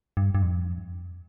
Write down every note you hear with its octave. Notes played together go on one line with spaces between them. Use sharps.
G2
G2
F2